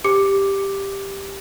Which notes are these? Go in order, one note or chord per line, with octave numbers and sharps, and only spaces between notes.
G4 D6 C#7